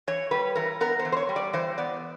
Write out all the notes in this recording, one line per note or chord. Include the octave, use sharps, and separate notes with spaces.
E3 C#5
G3 B4
E3 A#4
B3 A#4
C5
E3
C5
C#5
G3
D5
E3 C5
B3 D5